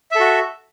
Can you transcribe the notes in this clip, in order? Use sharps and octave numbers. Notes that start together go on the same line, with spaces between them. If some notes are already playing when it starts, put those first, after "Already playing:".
F#4 A4 E5